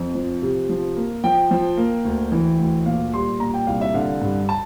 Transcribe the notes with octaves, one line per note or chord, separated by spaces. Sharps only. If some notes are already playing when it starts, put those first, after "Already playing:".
Already playing: F2
F3
C3
F3
A#3
F3 G5
F3
A#3
D2
E3
D2
A#2 F5
G3 C6
A#2 A#5
G5
C2 F5
E5
D3 F5
G2
A5